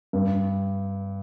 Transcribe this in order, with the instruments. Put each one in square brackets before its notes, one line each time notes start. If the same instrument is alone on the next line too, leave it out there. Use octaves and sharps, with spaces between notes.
[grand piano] G2